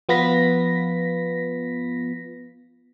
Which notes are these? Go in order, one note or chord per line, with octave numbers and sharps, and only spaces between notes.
F3 B3 F4 B4 A#6 B6